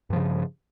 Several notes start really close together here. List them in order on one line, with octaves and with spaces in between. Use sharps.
G2 F3 C#3